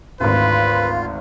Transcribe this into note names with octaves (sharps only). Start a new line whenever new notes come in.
G#1 D2 F4 B4